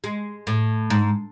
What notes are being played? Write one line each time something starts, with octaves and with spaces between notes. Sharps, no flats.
G#3
A2
G#2